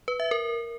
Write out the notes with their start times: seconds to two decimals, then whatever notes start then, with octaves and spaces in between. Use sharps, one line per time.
0.08 B4
0.20 E5
0.31 A#4